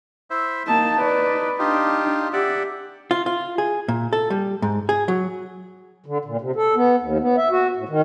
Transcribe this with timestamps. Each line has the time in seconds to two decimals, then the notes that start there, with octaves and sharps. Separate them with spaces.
0.30 E4 C5 E5
0.67 A#3 D#4 A5
1.01 B4 D5
1.59 D4 D#4 F4 G4
2.33 G4 D5 E5 F#5
3.11 F4
3.26 F4
3.58 G#4
3.88 A#2
4.13 A4
4.30 G3
4.62 G#2
4.89 G#4
5.08 F#3
6.06 D3
6.25 A#2
6.41 C3
6.55 A4
6.75 B3
7.00 D#2
7.20 B3
7.37 E5
7.50 F#4
7.76 A2
7.89 D#3